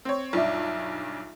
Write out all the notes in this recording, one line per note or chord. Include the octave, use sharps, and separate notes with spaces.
C4 C#5
B1 G2 F4 D5 E5